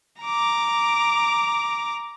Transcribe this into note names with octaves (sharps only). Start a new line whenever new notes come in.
A#5 D6